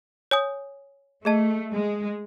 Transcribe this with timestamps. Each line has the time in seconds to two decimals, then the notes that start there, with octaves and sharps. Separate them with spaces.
0.31 C#5 G#5 D#6
1.25 A3 G#4 D#5 A5
1.71 G#3